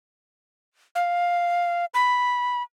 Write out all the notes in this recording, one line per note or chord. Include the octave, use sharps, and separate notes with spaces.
F5
B5